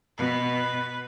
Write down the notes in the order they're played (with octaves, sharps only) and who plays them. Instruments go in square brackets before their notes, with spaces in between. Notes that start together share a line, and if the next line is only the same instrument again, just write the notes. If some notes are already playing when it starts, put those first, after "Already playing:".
[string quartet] B2 [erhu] B4